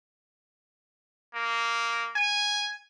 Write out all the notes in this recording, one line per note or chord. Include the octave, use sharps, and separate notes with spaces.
A#3
G#5